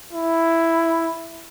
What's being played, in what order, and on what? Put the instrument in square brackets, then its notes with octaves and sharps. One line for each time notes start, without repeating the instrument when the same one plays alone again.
[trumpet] E4